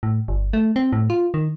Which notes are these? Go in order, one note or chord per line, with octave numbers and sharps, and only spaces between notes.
A2
G1
A3
C4
A2
F4
D#3